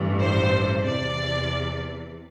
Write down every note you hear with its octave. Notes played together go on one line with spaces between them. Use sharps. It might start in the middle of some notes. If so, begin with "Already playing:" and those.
Already playing: A1 G2 E3
C5
E2 C3 E3 D5